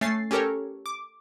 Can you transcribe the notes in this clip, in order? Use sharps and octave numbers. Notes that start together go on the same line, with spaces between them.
A3 C#4 A6 C7
C#4 G4 A4 A#4 C#5
D6